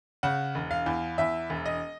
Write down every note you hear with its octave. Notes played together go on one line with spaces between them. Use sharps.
C#3 F#5
E1
F5
E2
E2 E5
E1
D#5